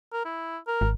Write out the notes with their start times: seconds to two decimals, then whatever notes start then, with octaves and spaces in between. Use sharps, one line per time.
0.13 A#4
0.25 E4
0.67 A#4
0.81 G#1